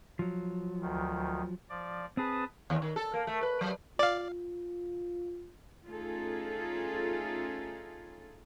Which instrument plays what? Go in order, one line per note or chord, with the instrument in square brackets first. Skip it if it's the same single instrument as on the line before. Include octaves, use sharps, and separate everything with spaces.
[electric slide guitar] F3 F#3
[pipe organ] D2 D#3
F3 D5
[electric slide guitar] C4 G#4 [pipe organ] B4 A5 D#6
[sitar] D#2
D#3
A4
A#3
A3
B4
F#3
[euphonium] F4 [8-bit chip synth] D5 F5
[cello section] A3 C#4 D#4 F4 G#4 A4